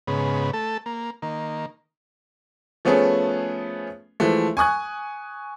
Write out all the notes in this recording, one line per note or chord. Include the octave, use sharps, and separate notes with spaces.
G#2 C#3 B3
A3 A4
A#3
D#3 A#3
F3 A3 B3 C#4 G#4
E3 F3 G#3 A3
G#5 C#6 D#6 F#6 G#6